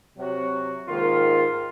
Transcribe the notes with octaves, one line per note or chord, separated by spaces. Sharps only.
C3 F#3 C4 F#4
G#2 D#3 A#3 F4